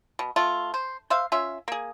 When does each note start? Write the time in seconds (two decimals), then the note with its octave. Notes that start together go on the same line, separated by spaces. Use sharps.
0.19 B2
0.36 A3 F4
0.74 C5
1.10 C5 E5 F5
1.32 C#4 F4 E5
1.68 A#3 G#4